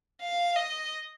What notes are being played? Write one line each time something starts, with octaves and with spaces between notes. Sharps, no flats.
F5
D#5